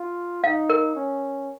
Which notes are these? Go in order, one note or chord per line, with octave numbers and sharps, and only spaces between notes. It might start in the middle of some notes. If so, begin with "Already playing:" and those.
Already playing: F4
D#4 F5
A#4
C#4